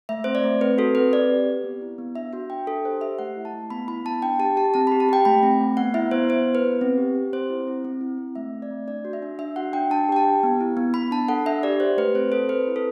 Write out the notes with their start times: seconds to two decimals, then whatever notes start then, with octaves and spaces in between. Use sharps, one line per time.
0.09 A3 E5
0.24 C4 C5
0.35 D5
0.44 A3
0.61 C4 B4
0.78 F#4 A4
0.95 C4 B4
1.12 C4 D5
1.30 G4
1.47 G4
1.64 B3
1.81 E4
1.98 B3
2.16 D4 E5
2.33 F#4 E5
2.50 D4 G5
2.67 D4 A4
2.85 G4 C5
3.01 G4 E5
3.19 A3 F#5
3.37 E4
3.45 A5
3.54 A3
3.70 B3 B5
3.88 E4 B5
4.05 B3 A5
4.22 D4 G5
4.39 G4 A5
4.57 G4 A5
4.74 C4 A5
4.87 B5
4.92 G4
5.00 A5
5.09 G4 G5
5.25 A3 B5
5.43 C4
5.61 A3
5.77 B3 F#5
5.94 E4 E5
6.11 B3 C5
6.29 B3 C5
6.46 E4
6.55 B4
6.63 B3
6.81 C4
6.98 G4
7.15 G4
7.33 C4 C5
7.50 E4
7.67 C4
7.85 C4
8.01 E4
8.18 C4
8.35 A3 E5
8.53 C4
8.62 D5
8.71 A3
8.87 D4 D5
9.05 F#4
9.13 E5
9.22 D4
9.39 D4 E5
9.56 F#4 F#5
9.73 D4 G5
9.90 D4 A5
10.09 G4 G5
10.16 A5
10.25 G4
10.43 B3
10.61 E4
10.77 B3
10.94 B3 B5
11.11 D4 A5
11.29 A4 F#5
11.46 D4 E5
11.63 G4 D5
11.80 G4 C5
11.97 A3 B4
12.15 C4 C5
12.32 A4 C5
12.49 C4 B4
12.67 E4
12.76 A4